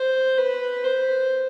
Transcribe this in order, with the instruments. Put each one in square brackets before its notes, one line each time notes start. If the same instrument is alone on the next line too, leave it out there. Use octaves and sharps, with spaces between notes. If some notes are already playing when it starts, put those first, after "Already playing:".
Already playing: [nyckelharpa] C5
B4
C5